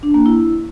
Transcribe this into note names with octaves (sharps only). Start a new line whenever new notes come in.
D4
A#3
E4